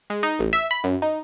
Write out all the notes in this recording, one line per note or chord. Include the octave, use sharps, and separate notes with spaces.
G#3
D#4
A1
E5
B5
F#2
D#4